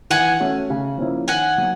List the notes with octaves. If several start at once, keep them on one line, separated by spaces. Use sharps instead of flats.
E3 F#5 G#5
A3 C#4 F#4
C#3
F3 A#3 C#4 E4
D#3 F#5 G#5
F#3 A#3